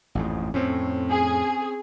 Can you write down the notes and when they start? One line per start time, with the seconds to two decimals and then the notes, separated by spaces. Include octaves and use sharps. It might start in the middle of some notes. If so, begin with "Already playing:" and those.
0.15 A1 F2 G#2
0.54 F2 A2 C4 C#4
1.10 G#4